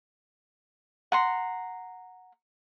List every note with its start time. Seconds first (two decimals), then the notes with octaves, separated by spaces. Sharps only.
1.12 F#5 A#5 C6